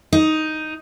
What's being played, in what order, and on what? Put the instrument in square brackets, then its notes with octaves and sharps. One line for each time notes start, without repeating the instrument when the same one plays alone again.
[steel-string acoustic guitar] D#4